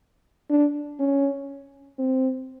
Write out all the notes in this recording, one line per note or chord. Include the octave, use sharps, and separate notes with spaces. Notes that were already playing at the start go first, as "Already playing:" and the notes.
D4
C#4
C4